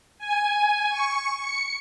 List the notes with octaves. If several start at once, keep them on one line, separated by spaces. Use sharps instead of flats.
G#5
C#6
C#7